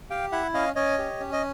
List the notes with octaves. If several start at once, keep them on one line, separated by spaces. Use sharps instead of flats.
G4 F5 G5
E4 E5 F#5
C#4 D#5 F5
C#4 C#5 D#5
G4
C#4
D#5